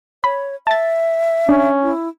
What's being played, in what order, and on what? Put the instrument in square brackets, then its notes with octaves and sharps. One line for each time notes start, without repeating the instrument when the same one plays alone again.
[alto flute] C#5 [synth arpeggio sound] B5
[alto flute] E5 [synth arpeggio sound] A5 A6
[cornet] C#4 [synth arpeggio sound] D4
[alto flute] E4